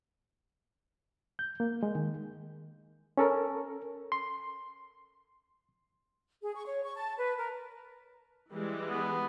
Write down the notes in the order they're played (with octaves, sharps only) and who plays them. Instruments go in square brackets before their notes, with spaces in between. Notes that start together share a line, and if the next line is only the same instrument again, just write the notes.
[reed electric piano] G6
A#3
G#3
D#3
C#4 A4 A#4
C6
[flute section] G#4
C#6
C#5
C#6
A5
B4
A#4
[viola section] E3 G3 G#3
[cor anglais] B3